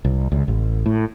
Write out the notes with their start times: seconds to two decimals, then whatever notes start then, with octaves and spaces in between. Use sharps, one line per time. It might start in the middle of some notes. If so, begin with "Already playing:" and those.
0.05 C2
0.32 C#2
0.48 A1
0.86 A2